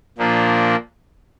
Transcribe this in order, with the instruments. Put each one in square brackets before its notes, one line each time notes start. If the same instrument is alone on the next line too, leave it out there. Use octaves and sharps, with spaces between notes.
[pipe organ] A#2 F3 A#3 D4